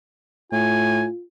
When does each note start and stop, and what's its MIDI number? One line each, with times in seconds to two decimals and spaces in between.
0.52 1.07 45
0.52 1.23 65
0.52 1.04 80